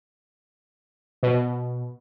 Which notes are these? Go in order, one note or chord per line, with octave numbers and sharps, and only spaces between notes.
B2